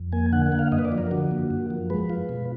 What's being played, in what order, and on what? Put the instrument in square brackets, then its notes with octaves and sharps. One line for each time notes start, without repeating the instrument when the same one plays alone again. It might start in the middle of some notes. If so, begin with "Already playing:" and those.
Already playing: [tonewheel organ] F2
A#3 G#5
D3 F#5
F#5
A#3
F5
F#2 D#5
B4
D5
F3
A#4
D3 F#4
A#3
F#2
F3
G#3 B4
F4
B2